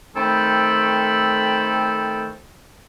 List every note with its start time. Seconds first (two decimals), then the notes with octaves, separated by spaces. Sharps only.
0.16 D#3 A3 C4 A4 G5 B5